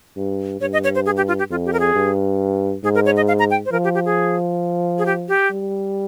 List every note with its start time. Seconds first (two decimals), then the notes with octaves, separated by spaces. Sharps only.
0.17 G2
0.61 G2 C#5
0.73 D#5
0.84 C#5
0.95 C5
1.06 G#4
1.17 G4
1.28 F4
1.39 G4
1.50 F2 F4
1.66 G4
1.73 A#4
1.80 G#4
1.95 G2
2.84 G#2 G#4
2.95 A#4
3.06 C#5
3.16 D#5
3.28 F5
3.39 A#5
3.51 G5
3.66 C5
3.72 F3 A#4
3.84 G4
3.94 G4
4.05 G#4
4.98 G#4
5.06 G4
5.28 G4
5.51 G3